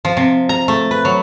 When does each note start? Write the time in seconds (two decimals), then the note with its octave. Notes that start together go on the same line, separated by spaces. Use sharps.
0.05 F3
0.17 C3
0.49 A#5
0.68 A3
0.91 B4
1.05 F#3